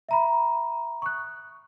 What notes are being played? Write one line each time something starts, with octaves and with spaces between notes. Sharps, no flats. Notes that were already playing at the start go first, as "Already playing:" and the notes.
E5 A#5 B5
C#6 D#6 F#6